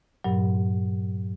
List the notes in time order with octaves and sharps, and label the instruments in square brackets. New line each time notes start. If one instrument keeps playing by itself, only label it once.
[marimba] G2 A#2 F#3